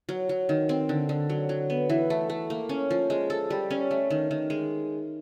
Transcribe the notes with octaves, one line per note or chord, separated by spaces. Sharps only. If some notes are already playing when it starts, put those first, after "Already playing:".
F#3
F#3
D#3
C4
D3
D3
F#3
F#3
B3
E3
A3
A3
A#3
C#4
F3
G#3
A4
G3
C#4
A3
D#3
D#3
G#3